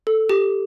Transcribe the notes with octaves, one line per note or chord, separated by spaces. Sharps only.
A4
G4